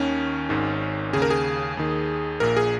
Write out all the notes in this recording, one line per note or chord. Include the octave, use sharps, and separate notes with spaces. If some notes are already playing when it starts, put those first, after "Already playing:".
Already playing: D#2 D#3 C#4
G#1 G#2 D#3
D#2 C#3 G#4
A#4
G#4
D#2 D#3
A#1 A#2 A#4
G#4